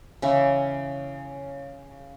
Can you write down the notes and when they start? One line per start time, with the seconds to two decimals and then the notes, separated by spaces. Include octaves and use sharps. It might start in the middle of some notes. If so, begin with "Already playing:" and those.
0.22 C#3 E3 E4 C#6